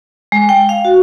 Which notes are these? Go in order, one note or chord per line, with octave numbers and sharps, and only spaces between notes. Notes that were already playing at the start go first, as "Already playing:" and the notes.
G#3
G5
F5
F#4